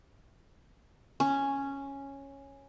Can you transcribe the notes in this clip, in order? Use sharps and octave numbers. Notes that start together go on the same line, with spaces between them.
C#4